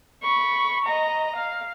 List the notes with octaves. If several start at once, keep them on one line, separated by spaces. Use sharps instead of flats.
B5 C#6
D#5 A#5
F5